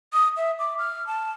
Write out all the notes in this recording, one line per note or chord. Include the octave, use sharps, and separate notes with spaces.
D#6
E5
D6
F6
A5